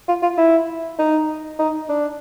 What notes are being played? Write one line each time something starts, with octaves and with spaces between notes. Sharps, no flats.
F4
F4
E4
D#4
D#4
D4